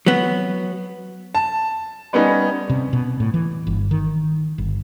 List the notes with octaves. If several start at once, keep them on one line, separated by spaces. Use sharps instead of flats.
F#3 B3
A5
G3 B3 C#4 D#4
C3
B2
A2
E3
G1
D#3
G1